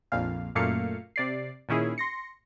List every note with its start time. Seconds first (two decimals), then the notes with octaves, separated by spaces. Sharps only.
0.12 A#1 F2 A#2 F5
0.55 F#2 A#2 A3 A#3 F5 C#7
1.16 C3 D5 C7
1.69 A#2 D#3 C#4 E4 G#4
1.98 C6 A#6 C#7